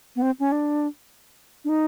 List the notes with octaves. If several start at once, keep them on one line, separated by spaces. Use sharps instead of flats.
B3
C4
C#4
D4
D4
D#4